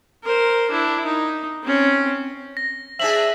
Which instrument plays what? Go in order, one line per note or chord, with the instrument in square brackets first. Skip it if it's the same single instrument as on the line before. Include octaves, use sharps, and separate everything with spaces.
[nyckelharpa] A#4 C5
D4 E4
D#4
C4 C#4
[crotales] A#6
[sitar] C4 D4 G#4 [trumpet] E5 [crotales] F#7